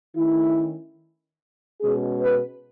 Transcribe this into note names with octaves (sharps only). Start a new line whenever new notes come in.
D#3 A3 C#4 E4
B2 G#3 C#4 G#4
B4